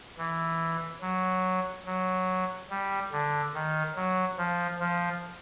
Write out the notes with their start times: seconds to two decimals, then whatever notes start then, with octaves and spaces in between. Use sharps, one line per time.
0.18 E3
1.01 F#3
1.86 F#3
2.70 G3
3.12 D3
3.54 D#3
3.96 F#3
4.38 F3
4.80 F3